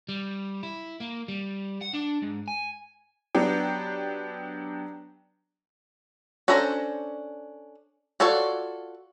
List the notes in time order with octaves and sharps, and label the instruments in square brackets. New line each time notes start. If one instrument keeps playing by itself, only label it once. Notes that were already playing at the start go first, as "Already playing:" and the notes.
[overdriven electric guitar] G3
E4
A#3
G3
F#5
D4
G#2
G#5
[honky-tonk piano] F#3 B3 D4 G4
[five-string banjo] C#4 D4 A4 C5 A#5
F4 F#4 A4 C#5 D5